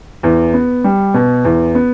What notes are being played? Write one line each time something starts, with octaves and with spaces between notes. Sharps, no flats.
E2
B3
G3
B2
E2
B3